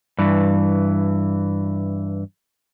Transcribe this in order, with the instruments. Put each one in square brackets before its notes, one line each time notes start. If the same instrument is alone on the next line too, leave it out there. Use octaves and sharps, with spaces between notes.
[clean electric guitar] G2 E3